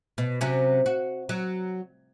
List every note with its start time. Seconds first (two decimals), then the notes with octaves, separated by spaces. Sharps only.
0.18 B2
0.41 C3 F#3 C#4
0.86 F#4
1.29 F#3